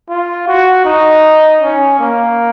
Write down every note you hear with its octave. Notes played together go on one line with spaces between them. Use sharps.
F4
F#4
D#4
C#4
A#3